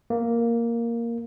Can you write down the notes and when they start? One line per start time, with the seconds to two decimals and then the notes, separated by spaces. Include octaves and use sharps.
0.10 A#3